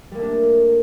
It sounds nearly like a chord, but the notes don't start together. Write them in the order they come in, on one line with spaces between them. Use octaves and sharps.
G3 A#3 A3 D4